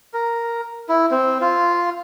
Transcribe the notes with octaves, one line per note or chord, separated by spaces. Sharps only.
A#4
E4
C4
F4